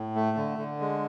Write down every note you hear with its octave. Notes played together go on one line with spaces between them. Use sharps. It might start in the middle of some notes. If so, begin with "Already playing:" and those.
Already playing: A2
A3
D3
D3
G#3